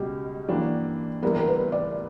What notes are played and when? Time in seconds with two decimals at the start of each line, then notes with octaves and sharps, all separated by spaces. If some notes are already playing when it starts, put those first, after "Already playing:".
Already playing: C#2 B2 G3 G4
0.48 G2 E3 A#3 D4 F#4
1.22 G1 G2 E3 G3 B3 A#4
1.36 A#4
1.48 B4
1.72 D5